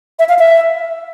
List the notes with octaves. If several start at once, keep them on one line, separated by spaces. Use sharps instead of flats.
E5
F5
E5